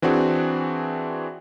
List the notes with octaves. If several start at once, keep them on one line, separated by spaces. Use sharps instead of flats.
E3 C4 D4 F#4 G#4